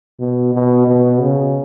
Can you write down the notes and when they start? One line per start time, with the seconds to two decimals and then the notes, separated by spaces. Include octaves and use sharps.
0.20 B2
0.53 B2
0.87 B2
1.21 C#3